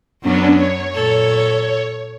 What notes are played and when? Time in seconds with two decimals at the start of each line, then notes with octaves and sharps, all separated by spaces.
0.23 F#2 F#3 B3 C#4 D4
0.56 C#5
0.94 A#2 A4